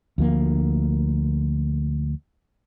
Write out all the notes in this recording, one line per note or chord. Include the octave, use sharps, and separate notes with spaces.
D2 F3 A#3